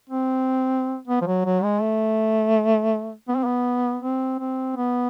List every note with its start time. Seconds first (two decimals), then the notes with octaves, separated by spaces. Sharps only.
0.09 C4
1.08 B3
1.21 F3
1.26 F#3
1.45 F#3
1.63 G#3
1.81 A3
3.29 B3
3.37 C4
3.44 B3
4.02 C4
4.40 C4
4.76 B3